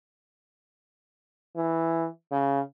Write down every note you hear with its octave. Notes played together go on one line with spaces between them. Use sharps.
E3
C#3